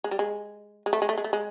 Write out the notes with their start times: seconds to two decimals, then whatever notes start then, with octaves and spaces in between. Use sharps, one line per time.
0.04 G#3
0.11 G3
0.19 G#3
0.86 G#3
0.93 A3
1.02 G#3
1.09 A3
1.18 G#3
1.24 A3
1.33 G#3